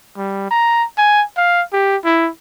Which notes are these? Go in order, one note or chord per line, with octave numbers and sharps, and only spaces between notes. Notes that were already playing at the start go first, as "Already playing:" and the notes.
G3
A#5
G#5
F5
G4
E4